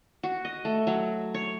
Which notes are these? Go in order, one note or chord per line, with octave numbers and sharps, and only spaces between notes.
F#4
D#5
A3
F#3
C#5